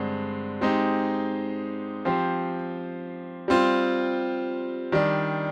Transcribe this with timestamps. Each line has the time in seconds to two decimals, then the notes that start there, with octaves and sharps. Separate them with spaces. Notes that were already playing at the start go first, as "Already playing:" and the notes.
Already playing: G2 D3 G#3 C4
0.61 G#3 C4 D#4 G4
2.05 F3 C4 G4 C5
3.48 G3 C4 F4
4.92 D#3 G3 D4